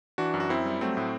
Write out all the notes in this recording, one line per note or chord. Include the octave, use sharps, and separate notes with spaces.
E3 D4 F#4
F#2
F#4
F#2 C4 E4
G3
F#3 A3 C4
A2